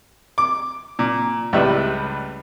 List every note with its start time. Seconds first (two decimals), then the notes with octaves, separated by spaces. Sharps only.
0.38 D6
0.99 A#2
1.53 C#2 A2 G3 B4 E5